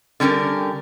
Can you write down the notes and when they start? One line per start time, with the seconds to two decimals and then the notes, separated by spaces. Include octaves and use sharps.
0.20 D3 G3 C#4 G4 A#4